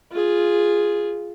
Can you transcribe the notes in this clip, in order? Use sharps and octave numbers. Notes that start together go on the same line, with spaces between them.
F4 G#4